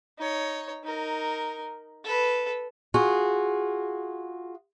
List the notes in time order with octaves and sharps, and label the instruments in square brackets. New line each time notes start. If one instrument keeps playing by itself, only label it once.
[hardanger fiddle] D#4 C#5
D#4 A#4
A4 B4
[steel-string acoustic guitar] F4 F#4 G#4